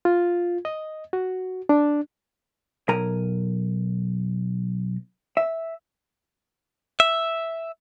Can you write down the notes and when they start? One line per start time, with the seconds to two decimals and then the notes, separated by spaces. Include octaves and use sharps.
0.05 F4
0.65 D#5
1.13 F#4
1.69 D4
2.89 B1 A#4 G#5 A#5
5.37 E5
7.00 E5